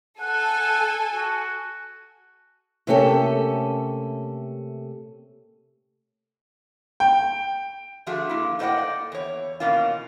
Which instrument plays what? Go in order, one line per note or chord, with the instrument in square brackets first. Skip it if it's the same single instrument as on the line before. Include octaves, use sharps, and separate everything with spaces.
[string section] A4 G#5 [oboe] F#5
[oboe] F#4
[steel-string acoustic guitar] C3 A3 A#3 C#4 G4 A4
[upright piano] G5
[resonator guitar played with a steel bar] D3 F3 A3 F#4 G#4
A#3 E4
A2 A#3 C5 D#5 F#5 G5
D5
E2 C#5
B2 E3 A#3 C#4 F4